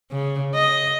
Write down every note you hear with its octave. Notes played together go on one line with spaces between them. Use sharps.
C#3
D#5